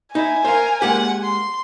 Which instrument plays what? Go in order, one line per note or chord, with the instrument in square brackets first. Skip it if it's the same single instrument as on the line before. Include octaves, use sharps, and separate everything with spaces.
[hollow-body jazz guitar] D#4 [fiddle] E4 [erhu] G#5
[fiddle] A#4 [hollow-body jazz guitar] C5 F5
[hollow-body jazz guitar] G#3 A#3 G4 [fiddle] F#5
[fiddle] C6